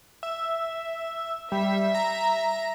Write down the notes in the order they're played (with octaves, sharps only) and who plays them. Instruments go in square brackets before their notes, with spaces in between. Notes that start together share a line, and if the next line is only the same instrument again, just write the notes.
[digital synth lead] E5
[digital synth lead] G3 [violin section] E5
[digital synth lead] A#5